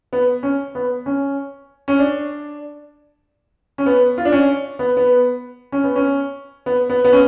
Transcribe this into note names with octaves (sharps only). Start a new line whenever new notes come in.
B3
C#4
B3
C#4
C#4
D4
C#4
B3
F4
D4
C#4
B3
B3
C#4
B3
C#4
B3
B3
B3
C#4